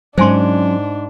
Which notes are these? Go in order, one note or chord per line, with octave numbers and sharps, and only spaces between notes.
G#2 F#3 C#4 D4 C5 G#5 C6